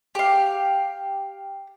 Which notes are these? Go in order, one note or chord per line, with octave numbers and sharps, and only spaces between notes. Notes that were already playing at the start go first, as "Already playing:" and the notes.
G4 F5